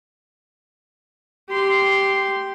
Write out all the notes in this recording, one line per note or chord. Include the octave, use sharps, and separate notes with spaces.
G4 C6